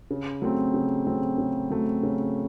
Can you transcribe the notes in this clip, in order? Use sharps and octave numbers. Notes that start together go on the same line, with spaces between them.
C#3
F#3 A3 C4
C#3
F#3 A3 C4
C#3
F#3 A3 C4
C#3